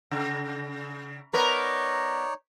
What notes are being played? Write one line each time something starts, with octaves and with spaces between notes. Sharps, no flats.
C#3
B3 D#4 A#4 B4 C#5 D5